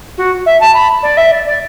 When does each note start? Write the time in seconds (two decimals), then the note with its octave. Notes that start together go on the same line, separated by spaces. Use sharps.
0.18 F#4
0.46 E5
0.60 A5
0.74 B5
1.03 D5
1.17 E5
1.31 D5
1.45 D5